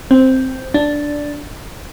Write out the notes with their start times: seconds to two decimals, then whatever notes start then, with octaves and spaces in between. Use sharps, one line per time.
0.11 C4
0.74 D4